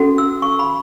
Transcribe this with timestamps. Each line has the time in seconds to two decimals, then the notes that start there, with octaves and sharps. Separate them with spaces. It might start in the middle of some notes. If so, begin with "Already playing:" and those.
Already playing: C#4 F#4 A4
0.18 E6
0.42 C#6
0.59 B5